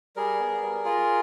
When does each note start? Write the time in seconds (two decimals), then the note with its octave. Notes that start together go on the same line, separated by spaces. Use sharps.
0.16 G3 G#4 A#4
0.40 B3
0.62 G3
0.85 F4